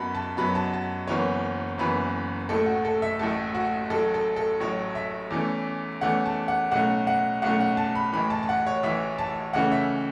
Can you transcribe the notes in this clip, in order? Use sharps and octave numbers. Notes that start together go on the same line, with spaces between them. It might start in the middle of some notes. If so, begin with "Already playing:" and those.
Already playing: F#2 F#3 B3 A5 B5
A5
F#2 F#3 B3 B5
A5
A5
F#1 F#2 E3 B3 C#5
F#1 F#2 E3 B3 B4
A1 A2 A3 A4
F#4
A4
E5
A1 A2 A3 A5
F#4
A1 A2 F#3 A4
A4
A4
A1 A2 F#3 C#5
E5
E2 E3 A3 C#4
E2 E3 A3 C#4 F#5
A5
F#5
B1 A2 A3 C#4 F#5
F#5
B1 A2 A3 C#4 F#5
F#5
A5
B5
A1 A2 E3 B5
A5
A5
F#5
C#5
A1 A2 E3 E5
A5
C#2 C#3 E3 A3 C#4 F#5
E5